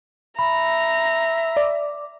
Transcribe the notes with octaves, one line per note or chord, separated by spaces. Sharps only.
E5 A#5 B5
D5